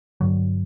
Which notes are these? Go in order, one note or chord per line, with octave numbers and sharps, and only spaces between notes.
G2 D3 F#3